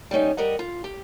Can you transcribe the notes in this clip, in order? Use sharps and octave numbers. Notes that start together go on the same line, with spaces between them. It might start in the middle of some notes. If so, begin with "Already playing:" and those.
G3 A#3 C#4 D#4
G3 G4 A#4 D#5 F#5
F4
G4